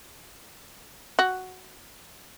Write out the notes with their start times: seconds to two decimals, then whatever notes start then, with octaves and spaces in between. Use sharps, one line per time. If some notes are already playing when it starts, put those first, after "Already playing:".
1.19 F#4